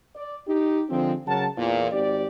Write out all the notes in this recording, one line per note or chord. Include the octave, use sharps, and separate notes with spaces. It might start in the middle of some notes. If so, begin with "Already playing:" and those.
D5
D#4 G4
D3 F3 G#3 C4
C#3 F#3 A#4 F#5 A5
E2 A#2
G#1 G4 D5